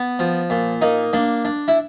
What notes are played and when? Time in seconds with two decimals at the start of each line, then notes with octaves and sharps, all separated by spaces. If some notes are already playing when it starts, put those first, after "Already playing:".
Already playing: B3
0.19 F3
0.50 A#2
0.81 A#3 D#4
1.13 A#3 D4
1.45 D4
1.68 E4